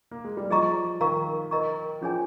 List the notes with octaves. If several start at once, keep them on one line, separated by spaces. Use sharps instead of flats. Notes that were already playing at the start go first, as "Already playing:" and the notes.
A#3
G#3
G3
F3 G#4 D#5 A#5 C#6
D#3 A#4 F5 A#5 C#6
A#4 D#5 A#5 C#6
F3 C#4 G#4 C#5 G#5